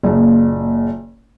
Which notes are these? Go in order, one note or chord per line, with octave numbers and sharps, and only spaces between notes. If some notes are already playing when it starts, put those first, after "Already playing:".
F#1 A#2